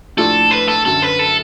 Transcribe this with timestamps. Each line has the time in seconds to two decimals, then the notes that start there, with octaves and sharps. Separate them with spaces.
0.17 A2 F3 A3 D4 F4 A4
0.51 B4
0.68 A4
0.85 F#2 D3 F#3 A4
1.02 B4
1.19 A4